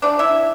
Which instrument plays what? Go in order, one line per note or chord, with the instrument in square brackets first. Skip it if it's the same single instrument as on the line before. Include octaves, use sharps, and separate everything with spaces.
[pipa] F3 A3 C4 D4 D5
E4 E5